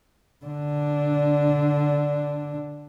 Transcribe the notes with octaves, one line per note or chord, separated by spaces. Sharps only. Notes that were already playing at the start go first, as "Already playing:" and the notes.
D3 D4